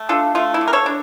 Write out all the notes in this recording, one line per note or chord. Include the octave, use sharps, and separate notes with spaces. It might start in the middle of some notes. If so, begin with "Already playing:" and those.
Already playing: A3
D4 F4 A4
A3 F4
E4
D3
A#4
A4 C#5
D4